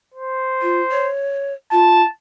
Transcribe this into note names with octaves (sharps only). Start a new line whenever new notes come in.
C5
F4
C#5
F4 A5